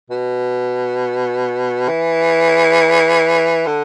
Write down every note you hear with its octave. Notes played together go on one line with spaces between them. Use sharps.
B2
E3
D3